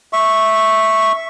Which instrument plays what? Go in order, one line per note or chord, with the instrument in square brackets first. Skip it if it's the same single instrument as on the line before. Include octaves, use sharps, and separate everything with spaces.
[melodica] E5 C#6